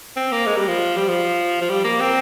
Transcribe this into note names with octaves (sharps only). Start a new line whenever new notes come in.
C4
A#3
G#3
G3
F3
G3
F3
F3
G3
A#3
C4